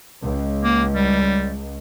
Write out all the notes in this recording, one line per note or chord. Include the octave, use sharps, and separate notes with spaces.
C#2
A#3
G3